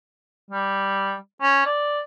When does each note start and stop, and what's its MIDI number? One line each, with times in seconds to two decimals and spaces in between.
0.51 1.15 55
1.42 1.64 61
1.66 2.00 74